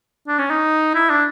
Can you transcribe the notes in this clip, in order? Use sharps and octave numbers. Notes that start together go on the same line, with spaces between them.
D4
C#4
D#4
E4
D4